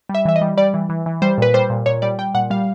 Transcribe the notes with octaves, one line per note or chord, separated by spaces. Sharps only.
G3
E5
E3 E5
D#5
G3
G3 D5
E3
E3
E3
G3 C5
A#2 B4
G3 C5
A#2
A#2 C#5
G3 D5
G3 G5
A#2 F#5
G3 F5